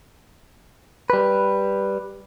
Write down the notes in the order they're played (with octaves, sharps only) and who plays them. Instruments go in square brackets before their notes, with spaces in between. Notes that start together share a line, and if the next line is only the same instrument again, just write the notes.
[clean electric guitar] G3 B4